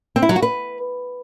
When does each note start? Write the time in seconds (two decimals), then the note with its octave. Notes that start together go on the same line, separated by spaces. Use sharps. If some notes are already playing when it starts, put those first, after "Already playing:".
0.16 C4
0.23 E4
0.29 F#3
0.36 F#4
0.42 B4